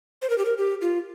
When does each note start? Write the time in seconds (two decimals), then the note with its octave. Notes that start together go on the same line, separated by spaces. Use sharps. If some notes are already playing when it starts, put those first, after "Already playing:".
0.22 C5
0.30 A#4
0.38 G4
0.45 A#4
0.58 G4
0.81 F4